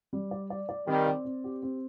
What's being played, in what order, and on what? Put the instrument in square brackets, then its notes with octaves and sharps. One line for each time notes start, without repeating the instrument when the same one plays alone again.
[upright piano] G3
D5
D5
D5
[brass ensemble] D#3 G3 [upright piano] C4
[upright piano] D5
C4
G4
C4